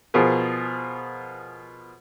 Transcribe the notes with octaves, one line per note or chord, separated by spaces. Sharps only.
B2 F3 F4 G#4 A#4